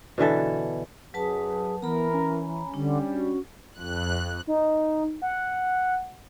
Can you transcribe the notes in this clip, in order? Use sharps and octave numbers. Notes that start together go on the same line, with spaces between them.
B2 D3 E3 A4
F#2 F#3 G#4 B4 A5
E3 B3 A#4 A#5 B5
C#4
D3 G3 D4
F#4
F2 F#6
D#4
F#5